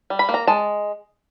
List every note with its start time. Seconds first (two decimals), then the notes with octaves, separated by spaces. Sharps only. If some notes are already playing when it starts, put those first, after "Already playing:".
0.10 G3
0.19 B5
0.29 A#3
0.34 A#5
0.47 G#3 A5